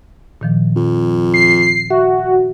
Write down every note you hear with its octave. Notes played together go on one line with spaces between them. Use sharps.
A#2 D#3 F3
F2
C7
C7
F#4 E5